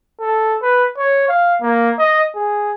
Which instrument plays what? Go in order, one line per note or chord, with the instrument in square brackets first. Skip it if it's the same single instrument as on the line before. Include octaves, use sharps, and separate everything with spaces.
[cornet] A4
B4
C#5
F5
A#3
D#5
G#4